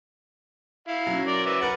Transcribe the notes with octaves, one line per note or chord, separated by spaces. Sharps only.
E4 F5
F#3 C#4
A#4 D5
B4 E5 D6
A#4 B4 F#5 A6